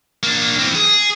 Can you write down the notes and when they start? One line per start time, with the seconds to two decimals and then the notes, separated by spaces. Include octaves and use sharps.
0.23 A#3 D4
0.59 E3 C4
0.75 G#4